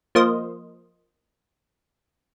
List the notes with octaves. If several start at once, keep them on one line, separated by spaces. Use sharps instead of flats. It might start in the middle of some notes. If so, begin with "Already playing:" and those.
F3 A#3 C5 D#5